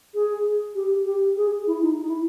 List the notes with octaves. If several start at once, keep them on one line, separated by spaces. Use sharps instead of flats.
G#4
G4
G4
G#4
E4
D#4
E4